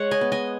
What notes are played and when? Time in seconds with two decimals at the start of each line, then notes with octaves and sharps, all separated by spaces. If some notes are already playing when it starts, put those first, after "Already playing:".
Already playing: G#3 C#5 F#5
0.11 D#5 G#5
0.21 B3
0.32 D#5 G#5